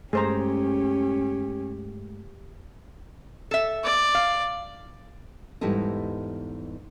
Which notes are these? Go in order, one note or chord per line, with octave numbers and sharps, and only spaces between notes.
G2 G#3 A3 C#4 G4 G#4 C5 A#5
A4 E5
D5
F5
E2 G#2 G3 E4 A4 D#5